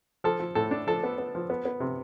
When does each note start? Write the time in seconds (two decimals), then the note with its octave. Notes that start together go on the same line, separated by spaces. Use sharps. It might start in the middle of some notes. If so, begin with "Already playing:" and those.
0.24 F3 A4
0.40 F3
0.55 A2 A4
0.71 D4
0.87 F3 A4
1.03 B3
1.18 B3
1.35 F3
1.50 B3
1.65 B3
1.80 C3